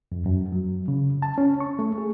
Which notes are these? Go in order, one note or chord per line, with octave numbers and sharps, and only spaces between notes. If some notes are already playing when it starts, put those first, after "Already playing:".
F2
F#2
F#3
C#3
A5
C#4
C#6
A3
G#4